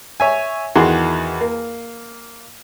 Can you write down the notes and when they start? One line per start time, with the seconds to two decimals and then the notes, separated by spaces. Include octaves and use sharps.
0.20 C#5 E5 G#5
0.75 E2 D#3 F#4 G#4 C6
1.41 A#3